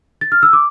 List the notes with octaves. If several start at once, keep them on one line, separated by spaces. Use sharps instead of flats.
A6
F6
E6
D6